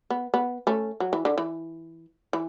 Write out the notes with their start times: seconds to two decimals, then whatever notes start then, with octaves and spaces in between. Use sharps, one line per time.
0.10 B3
0.34 B3
0.67 A3 C#4
1.00 F#3
1.13 E3
1.25 D3
1.38 E3
2.33 E3